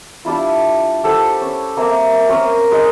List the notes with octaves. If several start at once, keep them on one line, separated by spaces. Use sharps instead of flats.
G3 D4 E4 F4
G4 A4 C5 F#5
C#4
A#3 C4 E5 G#5
C4 C#4 A#4 D#6
G#3 G#4 D#5